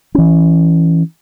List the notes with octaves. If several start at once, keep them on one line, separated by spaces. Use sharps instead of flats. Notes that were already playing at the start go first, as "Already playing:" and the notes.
E3 C#4